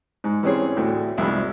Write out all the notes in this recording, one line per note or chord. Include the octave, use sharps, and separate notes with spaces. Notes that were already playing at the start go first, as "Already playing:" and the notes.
G#2
E3 G3 C4 C#4 G#4 C#5
D2 A2
C2 F2 G#2 G3 B5